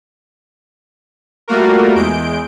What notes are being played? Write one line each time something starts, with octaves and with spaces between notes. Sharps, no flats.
G3 A3 A#3 F4 F#4 A#4
E2 G#3 G6 D7